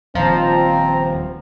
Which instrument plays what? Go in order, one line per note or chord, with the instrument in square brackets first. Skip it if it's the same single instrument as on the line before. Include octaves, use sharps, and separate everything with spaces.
[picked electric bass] D#1 D#3 [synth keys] F3 [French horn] C4 [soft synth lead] A#5